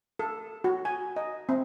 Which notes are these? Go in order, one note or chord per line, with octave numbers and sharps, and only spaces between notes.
A4
F#4
G#5
D#5
C4